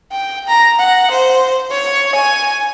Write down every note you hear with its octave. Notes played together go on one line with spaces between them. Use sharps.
G5
A#5
F#5
C5
C#5
G#5